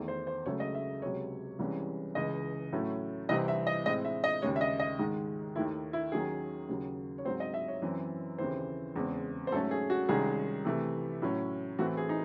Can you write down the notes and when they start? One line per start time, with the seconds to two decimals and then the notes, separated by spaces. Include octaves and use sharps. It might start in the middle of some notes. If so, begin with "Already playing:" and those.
Already playing: E2 D#3 A3
0.08 C5
0.27 C5
0.46 C#2 C#3 F#3 A3 C#5
0.60 D#5
0.75 E5
1.02 C#2 C3 F#3 C#5
1.59 C2 C3 E3 G#3 C#4
2.15 C#2 C#3 E3 D#5
2.72 A2 F#3 A3 C#4
3.29 C2 C3 E3 C4 D#5
3.48 E5
3.67 D#5
3.85 A2 G#3 C4 D#5
4.05 E5
4.24 D#5
4.42 D#2 C#3 G#3 C#5
4.56 E5
4.61 D#5
4.80 D#5
4.99 G#2 D#3 G#3
5.56 D#2 D#3 A3 E4
5.93 E4
6.12 D#2 D#3 F#3 C#4 G#4
6.69 D#2 C#3 F#3
7.18 C#5
7.25 G#2 F#3 C4 C5
7.40 D#5
7.54 E5
7.68 C#5
7.82 F#2 E3 C4
8.38 D#2 C#3 E3 C4 C5
8.96 E2 C#3 G#3 C4
9.47 C5
9.52 G#2 F#3 A3 C#4 A4
9.71 G#4
9.90 F#4
10.09 C2 C3 D#3 G#3 C#4 G#4
10.65 C3 E3 A3
11.22 A2 F#3 C#4
11.79 A2 E3 A3 C4 F#4
11.97 G#4
12.09 D#4